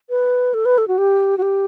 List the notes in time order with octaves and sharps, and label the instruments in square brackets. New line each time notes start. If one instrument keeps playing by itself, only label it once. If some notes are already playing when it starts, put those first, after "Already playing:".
[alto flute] B4
A4
B4
A4
F#4
G4
F#4
G4